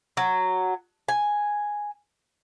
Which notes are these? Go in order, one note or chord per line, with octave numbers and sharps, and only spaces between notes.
F#3
G#5